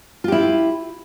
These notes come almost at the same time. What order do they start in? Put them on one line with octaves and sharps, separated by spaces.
F4 G4 E4